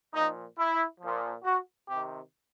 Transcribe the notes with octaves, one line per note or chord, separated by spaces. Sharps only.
A#2 F3 D#4
E4
A#2 F3
F#4
C3 D#3 G4